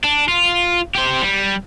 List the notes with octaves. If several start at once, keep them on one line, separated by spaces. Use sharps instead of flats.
D4
F4
G4 C5
G3